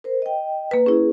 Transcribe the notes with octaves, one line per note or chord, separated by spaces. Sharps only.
A#4 C5
D#5 G5
A#3 B4
C#4 E4 G#4